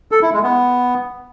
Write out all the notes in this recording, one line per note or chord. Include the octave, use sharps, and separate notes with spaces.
A4
E4
G#3
B3